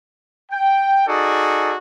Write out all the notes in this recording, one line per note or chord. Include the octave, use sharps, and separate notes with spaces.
G5
D#4 F#4 G#4 A4 D5